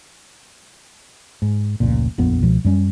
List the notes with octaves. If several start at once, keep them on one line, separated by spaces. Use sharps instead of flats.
G#2
F1 C#2 A#2
D#1 A#1 F2 B3
C#2 B2 F3
F#2 G3 C#4